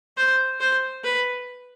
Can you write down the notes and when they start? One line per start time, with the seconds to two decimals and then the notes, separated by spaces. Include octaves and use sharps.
0.17 C5
0.60 C5
1.04 B4